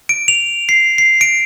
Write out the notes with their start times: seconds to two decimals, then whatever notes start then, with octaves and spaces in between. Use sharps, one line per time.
0.09 D7
0.28 F7
0.69 C7
0.98 C7
1.21 D7